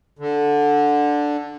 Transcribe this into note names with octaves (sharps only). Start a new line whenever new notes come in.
D3